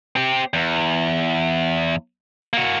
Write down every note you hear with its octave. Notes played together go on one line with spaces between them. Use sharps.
C4 G4
E2
A#3 F#4